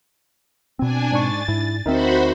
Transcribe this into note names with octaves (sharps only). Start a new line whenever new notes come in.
B2 C4 D4 G#5
G#2 D4 C#6 A6
G#2 E4
D2 C4 D#4 F#4 A#4 C5 E5 B5